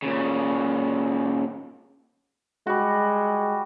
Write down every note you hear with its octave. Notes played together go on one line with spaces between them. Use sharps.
A#2 C#3
G3 G#3 F#4